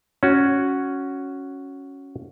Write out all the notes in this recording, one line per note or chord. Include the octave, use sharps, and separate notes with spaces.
C#4 F#4